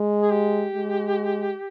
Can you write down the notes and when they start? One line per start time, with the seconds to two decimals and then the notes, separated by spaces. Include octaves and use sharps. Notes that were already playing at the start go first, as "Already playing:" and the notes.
Already playing: G#3
0.22 G#4
0.31 G4
0.75 G#3